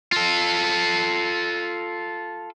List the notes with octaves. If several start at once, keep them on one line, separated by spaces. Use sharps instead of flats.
F4 A4